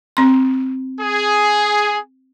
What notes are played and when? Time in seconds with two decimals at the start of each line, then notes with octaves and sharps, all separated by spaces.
0.17 C4 C6
1.01 G#4